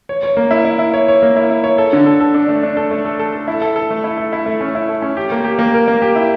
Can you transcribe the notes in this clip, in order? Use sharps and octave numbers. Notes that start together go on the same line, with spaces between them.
C#5
C#5
A#3
E4
E4
E4
C#5
C#5
A#3
E4
E4
C#5
A4
D3
A4
A4
D4
A3
D4
A4
A3
A4
A4
A4
E4
A4
A4
A3
E4
A4
E4
A3
C#4
E4
A4
C#4
G4
A#3
G4
A#3
A#4
A#3
G4
E4